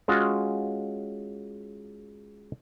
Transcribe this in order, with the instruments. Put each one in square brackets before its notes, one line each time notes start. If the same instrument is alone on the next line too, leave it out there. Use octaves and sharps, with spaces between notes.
[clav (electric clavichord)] G#3 C#4 F4 F#4